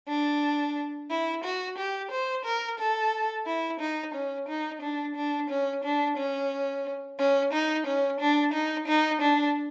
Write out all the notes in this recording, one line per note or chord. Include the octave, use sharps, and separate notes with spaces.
D4
E4
F#4
G4
C5
A#4
A4
E4
D#4
C#4
D#4
D4
D4
C#4
D4
C#4
C#4
D#4
C#4
D4
D#4
D#4
D4